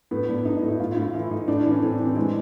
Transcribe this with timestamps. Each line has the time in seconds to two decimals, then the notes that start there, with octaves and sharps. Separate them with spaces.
0.11 A2 B3
0.28 A2 D4
0.45 A2 D#4
0.57 D#4
0.63 A2
0.68 E4
0.80 A2 F4
0.91 F4
0.97 A2
1.02 F4
1.14 E3 E4
1.31 A2 D#4
1.48 A2 D4
1.59 D4
1.65 E3
1.71 C#4
1.82 A2 C4
1.94 D4
1.99 E3
2.05 C4
2.16 E3 G#3